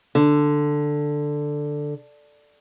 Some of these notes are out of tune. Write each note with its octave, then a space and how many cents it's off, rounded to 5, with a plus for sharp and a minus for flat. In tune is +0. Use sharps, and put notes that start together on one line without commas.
D3 +5